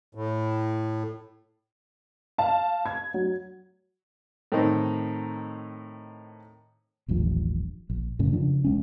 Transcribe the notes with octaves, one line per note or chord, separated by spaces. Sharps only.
A2
F5 A5
G#6
F#3
A2 D#3 C4 D#4
D#1 A1 G2 F3
A#1
F#2 A2 C#3
F2 C#3 F3 D4
C2 G#3 C#4